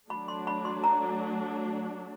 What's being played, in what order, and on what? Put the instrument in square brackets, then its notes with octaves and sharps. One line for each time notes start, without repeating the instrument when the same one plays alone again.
[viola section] F#3 A3 D4 [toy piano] B5
[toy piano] C6
B5
C6
A#5